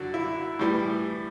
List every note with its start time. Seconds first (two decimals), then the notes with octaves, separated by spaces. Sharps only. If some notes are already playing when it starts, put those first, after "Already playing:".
Already playing: F#2 D3 F#3 F#4 D5
0.14 E4
0.59 A2 E3 G3